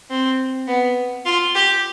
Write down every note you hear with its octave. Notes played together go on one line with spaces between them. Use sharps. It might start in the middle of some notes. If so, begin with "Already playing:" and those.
C4
B3
F4
G4